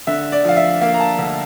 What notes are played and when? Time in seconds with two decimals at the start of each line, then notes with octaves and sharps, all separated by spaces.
0.07 D3 E5
0.32 D5
0.45 F3 F5
0.57 E5
0.81 A#3 F5
0.94 A#5
1.00 A5
1.18 D2